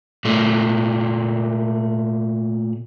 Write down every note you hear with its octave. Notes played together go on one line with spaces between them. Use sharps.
A#2 A3